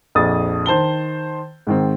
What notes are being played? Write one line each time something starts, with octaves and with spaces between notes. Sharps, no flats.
A#1 F2 D#6 A6
D#3 C5 A5 G7
G#2 D#3 C4